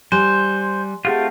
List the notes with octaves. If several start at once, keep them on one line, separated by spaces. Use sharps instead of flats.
G3 C5 G#5 C6 F#6
A3 C4 F4 G4 G#4 F#5